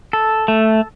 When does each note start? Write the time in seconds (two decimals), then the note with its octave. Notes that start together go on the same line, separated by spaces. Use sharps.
0.13 A4
0.48 A3